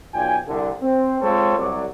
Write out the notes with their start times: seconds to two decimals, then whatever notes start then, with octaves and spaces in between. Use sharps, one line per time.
0.14 B1 F4 D5 G5 G#5
0.47 C2 D3
0.81 C4
1.21 G#3 C4 F4 A4 C5 C#5
1.57 C2 F#3 D5